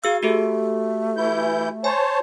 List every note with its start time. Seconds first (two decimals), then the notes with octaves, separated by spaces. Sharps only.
0.04 F#4 G#4 F5 E6
0.23 A3 F#4 G4 A4
1.17 E3 E4 G6
1.84 C5 C#5 G#5 A5